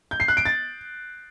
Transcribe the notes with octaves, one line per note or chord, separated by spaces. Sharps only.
G6
C7
F#6
D7
A6